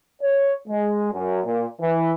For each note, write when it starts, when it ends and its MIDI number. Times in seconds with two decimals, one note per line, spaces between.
0.21 0.56 73
0.67 1.12 56
1.12 1.42 42
1.44 1.66 46
1.80 2.12 52